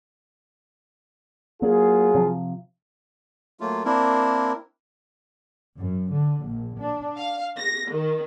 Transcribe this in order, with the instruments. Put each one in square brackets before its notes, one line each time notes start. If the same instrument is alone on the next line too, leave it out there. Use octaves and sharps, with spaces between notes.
[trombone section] F#3 F4 G#4 [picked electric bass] A#3
[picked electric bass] C3 F3
[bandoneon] F#3 A3 A#3 F4
A#3 C4 D4 E4 A#4
[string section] F#2
D3
A#1
D4
F5
A#6
D#3